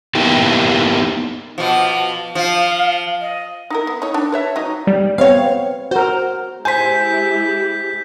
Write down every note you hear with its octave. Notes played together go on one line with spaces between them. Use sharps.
A#3 B3 D#4 E4 G4
B2 F3
F3 F5
D#5
D#4 E4 A#4
B3
D#4 C#5
D4
B4 C#5 E5
F#3 D#4
G3
B3 C4 C#5 F5
F#4 A#4 C5
G#3 E4 G4 C5 G#5 G6 B6